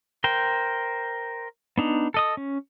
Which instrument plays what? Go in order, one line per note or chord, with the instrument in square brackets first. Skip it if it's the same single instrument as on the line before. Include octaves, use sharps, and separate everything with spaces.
[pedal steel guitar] A#4 C5 G5
B3 D4 D#4
A4 D#5 D#6
C#4